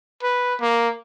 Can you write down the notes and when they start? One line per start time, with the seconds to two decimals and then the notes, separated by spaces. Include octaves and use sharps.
0.23 B4
0.61 A#3